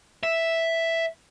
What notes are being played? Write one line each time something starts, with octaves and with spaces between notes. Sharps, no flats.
E5